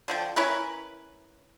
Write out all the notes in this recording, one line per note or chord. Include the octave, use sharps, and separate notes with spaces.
D3 F3 G5
C#4 E4 A#4 B4